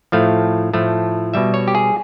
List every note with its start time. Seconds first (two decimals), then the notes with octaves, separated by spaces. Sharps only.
0.12 A2 F3 A3 F5
0.74 A2 F3 A3
1.34 B2 G3 E5
1.54 C#5
1.68 G4
1.75 G#4